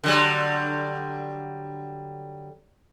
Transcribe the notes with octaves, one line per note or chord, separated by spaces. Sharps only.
D3 F#3 G3